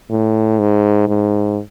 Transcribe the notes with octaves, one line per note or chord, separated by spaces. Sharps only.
A2
G#2
G#2